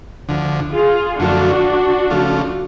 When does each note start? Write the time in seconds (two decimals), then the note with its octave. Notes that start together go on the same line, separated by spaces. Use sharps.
0.29 D2 D3 F3
0.74 F4 G#4
1.19 F#2 D3 F3 A3 D4 F4 F#4
2.10 C#3 F3 A3 F4